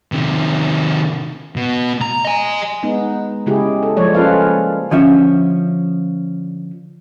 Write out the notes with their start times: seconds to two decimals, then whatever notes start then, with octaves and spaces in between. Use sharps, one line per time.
0.12 C3 D#3
1.56 B2
2.02 A#5
2.25 D#5 G#5
2.83 G#3 B3 D#4
3.46 C#3 G#3 E4 G4 G#4
3.83 A4
3.97 F3 G3 G#3 A#3 C#5 D5
4.14 C#4 F4 A4 B4 F5
4.91 D3 F3 C#4 E5